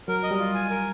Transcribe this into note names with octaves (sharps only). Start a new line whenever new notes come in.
F#3 A#4
D#5
G3
F4
G#5
A#4